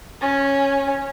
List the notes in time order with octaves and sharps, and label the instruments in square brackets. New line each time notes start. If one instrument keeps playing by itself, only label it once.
[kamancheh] C#4